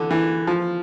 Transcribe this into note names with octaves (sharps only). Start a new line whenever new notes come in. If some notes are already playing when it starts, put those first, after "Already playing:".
Already playing: D3 E3
E3
F3